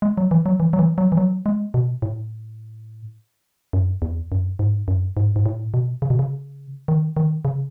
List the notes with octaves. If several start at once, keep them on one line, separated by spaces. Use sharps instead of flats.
G#3
F#3
E3
F#3
E3
F#3
E3
F#3
E3
F#3
G#3
B2
A2
F#2
E2
F#2
G#2
F#2
G#2
G#2
A2
B2
C#3
B2
C#3
D#3
D#3
C#3